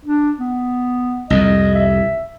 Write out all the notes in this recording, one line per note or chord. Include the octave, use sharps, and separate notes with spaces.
D4
B3
C2 F2 D#5
E5